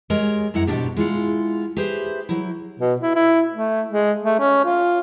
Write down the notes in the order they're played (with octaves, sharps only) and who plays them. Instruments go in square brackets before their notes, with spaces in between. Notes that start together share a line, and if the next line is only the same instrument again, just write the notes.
[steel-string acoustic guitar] G#3 G4 G#4 A#4 C#5
F#2 E4 F#5 A#5
G#2 B2 A#3 C4 D4 G4
G#3 E4 F4 F#5
G4 G#4 B4 C5 E5
F#3 E4
[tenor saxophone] B2
E4
E4
A3
G#3
A3
C#4
F4